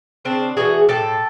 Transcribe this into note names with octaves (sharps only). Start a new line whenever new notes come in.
C#3 C4 D4
E3 A3 F#4 G#4
A2 G4 A4